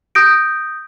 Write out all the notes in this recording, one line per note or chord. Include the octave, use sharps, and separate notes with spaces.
D#6 G6 A#6 D7